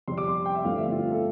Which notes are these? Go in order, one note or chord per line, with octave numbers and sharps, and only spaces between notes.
F2 C3 G3 C6
D6
C6
G5
E5
G1 G2 F3 A3 C4 F5
E5
F4
A4